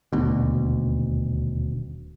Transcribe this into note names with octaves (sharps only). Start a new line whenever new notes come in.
D#1 D2 B2